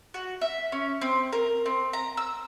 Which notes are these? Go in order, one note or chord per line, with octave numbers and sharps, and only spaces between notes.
F#4
E5
C#4
C4
A#4
C4
A#5
E6